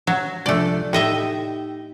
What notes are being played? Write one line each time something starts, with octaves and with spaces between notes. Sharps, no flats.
F#3
C2 F3 A3 D4 D5
A2 D#4 G4 D#5 E5